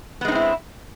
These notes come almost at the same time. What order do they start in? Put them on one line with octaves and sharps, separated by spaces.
B3 G#3 D#4 C4 E4